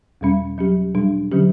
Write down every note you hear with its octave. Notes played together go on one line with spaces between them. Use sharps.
E2 B2 G3 C#4
F#3 C#4 G4
B2 G3 D4
D3 F#3 C#4 G4